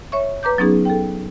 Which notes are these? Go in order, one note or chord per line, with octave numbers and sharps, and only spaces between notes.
C#5 E5 C#6
B4 A#5 D6 G6
F#3 B3 C#4 D#4 G#4
A4 G5